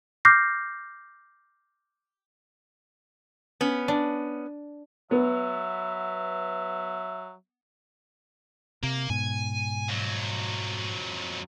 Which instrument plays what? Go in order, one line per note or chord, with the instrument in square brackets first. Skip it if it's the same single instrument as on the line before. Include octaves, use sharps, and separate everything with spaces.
[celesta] D6 F6 G6 A#6 C7
[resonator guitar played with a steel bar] B3 C#4
[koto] D4
[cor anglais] F#3 [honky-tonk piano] B3 [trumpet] E5
[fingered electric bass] C3 [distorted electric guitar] A#3
[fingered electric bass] G#2 B2 [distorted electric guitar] G#5
[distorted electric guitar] F2 F#3